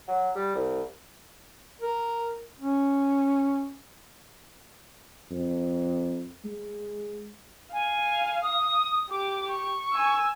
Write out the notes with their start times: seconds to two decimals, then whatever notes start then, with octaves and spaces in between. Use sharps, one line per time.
0.08 F#3
0.35 G3
0.55 C2
1.81 A#4
2.60 C#4
5.30 F2
6.44 G#3
7.72 F5 G#5
8.41 D#6
9.10 G4 D6
9.48 C#6
9.93 G#5 E6